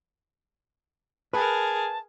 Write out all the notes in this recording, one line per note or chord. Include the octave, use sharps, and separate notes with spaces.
G#4 A#4 B4 A5